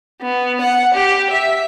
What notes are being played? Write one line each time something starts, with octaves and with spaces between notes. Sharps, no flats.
B3
F#5
G4
E5